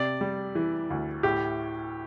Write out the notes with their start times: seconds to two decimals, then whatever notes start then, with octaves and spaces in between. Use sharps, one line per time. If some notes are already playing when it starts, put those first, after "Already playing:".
Already playing: C3 D5
0.21 G3
0.55 E3
0.90 D2
1.23 A2 G4